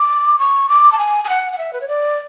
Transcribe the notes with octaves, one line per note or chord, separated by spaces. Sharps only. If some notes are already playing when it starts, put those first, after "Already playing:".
Already playing: D6
C#6
D6
A5
G#5
G#5
F#5
F#5
E5
B4
C#5
D5